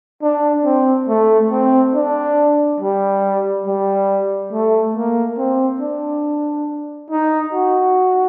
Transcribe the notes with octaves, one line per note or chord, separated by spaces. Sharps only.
D4
C4
A3
C4
D4
G3
G3
A3
A#3
C4
D4
D#4
F#4